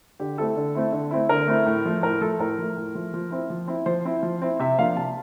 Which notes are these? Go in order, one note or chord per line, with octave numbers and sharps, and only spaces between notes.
D3 G4
A3 C4 E4 A4
D3
A3 C4 E4
D3
A3 C4 E4
D3 A#4
A3 C4 E4
A2
F3 A3
A2 A#4
F3 A3 A4
A2 A#4
F3 A3
A2
F3 A3
F3
C4 E4
F3
C4 E4
F3 C5
C4 E4
F3
C4 E4
C3 E5
F3 A#3 D4 F5
C3 A5